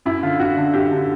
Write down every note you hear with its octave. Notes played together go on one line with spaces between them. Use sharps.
F#2 E4
D3 F4
F#2 F#4
D3
F#2 G4
D3